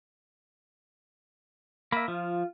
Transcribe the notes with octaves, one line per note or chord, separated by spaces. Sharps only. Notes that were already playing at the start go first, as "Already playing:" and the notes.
A#3 E5 B5
F3 F4